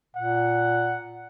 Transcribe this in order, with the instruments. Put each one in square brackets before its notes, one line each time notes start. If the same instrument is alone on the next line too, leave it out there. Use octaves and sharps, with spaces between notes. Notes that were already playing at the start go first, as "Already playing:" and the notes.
[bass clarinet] A#2 [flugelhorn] F#5